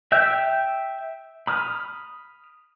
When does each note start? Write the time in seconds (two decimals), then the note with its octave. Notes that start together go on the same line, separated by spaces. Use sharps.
0.12 E5 G5 E6 G6
1.47 B5 D#6 F6